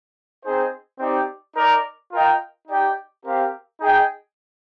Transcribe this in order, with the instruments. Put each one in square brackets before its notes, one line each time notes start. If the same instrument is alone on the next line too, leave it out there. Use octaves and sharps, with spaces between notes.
[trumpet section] C4 D#4 G#4 C5
C4 D#4 G4 D5
D#4 A#4 D5
F4 A#4 D#5 G5
D#4 G4 D5 G5
C4 G4 A#4 F5
D#4 G#4 D#5 G5